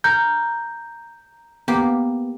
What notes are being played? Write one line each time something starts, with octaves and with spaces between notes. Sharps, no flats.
A#4 A#5 G6
A#3 B3 G4